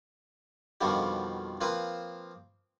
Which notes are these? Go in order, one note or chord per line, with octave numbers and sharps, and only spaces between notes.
F2 B2 D3 D#3 F3 G3
F3 A#3 C4 B4